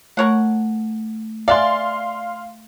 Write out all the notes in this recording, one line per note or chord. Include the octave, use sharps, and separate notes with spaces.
A3 A#4 C#5 F#5
B3 D5 E5 F5 G#5 C6